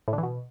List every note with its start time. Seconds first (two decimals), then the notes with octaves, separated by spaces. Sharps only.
0.08 A2
0.13 D3
0.18 E3
0.23 B2